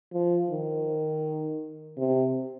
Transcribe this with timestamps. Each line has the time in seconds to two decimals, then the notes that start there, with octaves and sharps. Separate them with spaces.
0.13 F3
0.50 D#3
1.97 C3